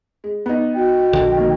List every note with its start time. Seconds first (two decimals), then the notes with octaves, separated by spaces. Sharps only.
0.24 G#3
0.46 B3 D#4
0.75 F#4 D#5 G5
1.13 A#1 D3
1.37 D#3 A#3